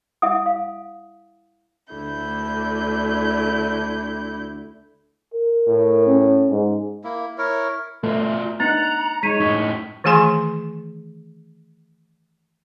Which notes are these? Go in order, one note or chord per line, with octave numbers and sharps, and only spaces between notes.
E4 E5 F#5 G#5 D#6
F5
D2 D3 E4 G6
A#4
A2
C#4
G#2
A#3 E4
E4 A#4 C#5
B2 A3 F4 B4
B3 D4 D#4 F#5 A#5 A6
G#3 D#4 C#5 B6 D#7
F#2 A2 D#4
D#3 E3 A3 G#4 G#5 C6